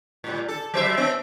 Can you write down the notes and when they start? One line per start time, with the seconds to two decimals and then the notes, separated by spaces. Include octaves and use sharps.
0.24 A2 G3
0.48 A4
0.74 F#3 C5 E5
0.97 B3